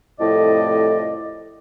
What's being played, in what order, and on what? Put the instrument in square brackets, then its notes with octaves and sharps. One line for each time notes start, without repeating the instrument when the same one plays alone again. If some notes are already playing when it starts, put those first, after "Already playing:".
[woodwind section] C2 F2 A2 D5 D#5